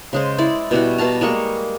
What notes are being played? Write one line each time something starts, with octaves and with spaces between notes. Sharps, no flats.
C#3 G#3 C5
E4 D5
B2 G3 E4 F#4
B2 F5 A5 A#5
G3 G#3 A#3 C#6